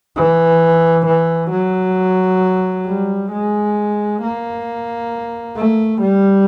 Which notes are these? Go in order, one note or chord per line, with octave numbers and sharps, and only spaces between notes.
E3
E3
F#3
G3
G#3
A#3
A3
G3